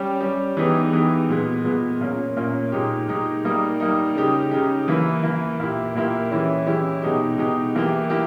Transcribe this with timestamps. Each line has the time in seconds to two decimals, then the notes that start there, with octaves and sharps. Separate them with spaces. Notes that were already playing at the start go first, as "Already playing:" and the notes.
Already playing: G3 C#4 G4
0.21 G3 C#4 G4
0.57 E3 G#3 B3 D#4 G4
0.93 E3 G#3 B3 D#4 G4
1.29 A#2 G#3 B3
1.64 A#2 G#3 B3
2.01 A#2 A#3 C#4
2.36 A#2 A#3 C#4
2.72 A#2 G#3 D#4 G4
3.08 A#2 G#3 D#4 G4
3.45 G3 A#3 D#4
3.80 G3 A#3 D#4
4.15 C#3 G#3 D#4 G4
4.51 C#3 G#3 D#4 G4
4.88 E3 A#3 E4
5.23 E3 A#3 E4
5.60 A#2 A#3 E4 G4
5.95 A#2 A#3 E4 G4
6.31 E3 G#3 C#4 E4 G4
6.67 E3 G#3 C#4 E4 G4
7.02 B2 G#3 D#4 G4
7.38 B2 G#3 D#4 G4
7.75 E3 A#3 E4 G4
8.10 A#3 E4 G4